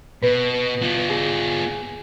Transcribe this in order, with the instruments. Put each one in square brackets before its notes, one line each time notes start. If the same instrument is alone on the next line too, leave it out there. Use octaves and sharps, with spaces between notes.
[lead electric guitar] B2 [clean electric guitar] B4
[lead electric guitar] B3 F4
[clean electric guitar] G#4